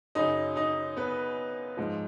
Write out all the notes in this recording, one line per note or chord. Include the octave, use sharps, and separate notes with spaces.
F#2 C#3 F#3 D#4 D#5
D#4 D#5
B3 B4
G#2 F3